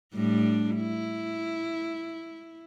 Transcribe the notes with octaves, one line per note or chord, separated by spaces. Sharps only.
A2 G3 D4
E4